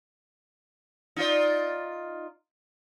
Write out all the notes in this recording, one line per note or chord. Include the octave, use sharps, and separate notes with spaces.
D#4 F4 D5